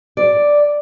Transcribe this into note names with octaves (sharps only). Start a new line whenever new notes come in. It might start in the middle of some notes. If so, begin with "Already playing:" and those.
D5